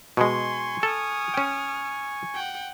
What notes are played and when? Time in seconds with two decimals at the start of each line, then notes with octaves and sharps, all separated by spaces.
0.17 B2 G#3 G#5 C6 C#6
0.83 A4 D#6 F6
1.34 C#4 G5
2.35 F#5 G5